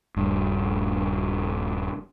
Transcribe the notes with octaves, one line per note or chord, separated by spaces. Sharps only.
D#1 G2